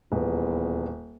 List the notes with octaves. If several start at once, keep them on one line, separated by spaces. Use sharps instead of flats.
D#1 E2 B3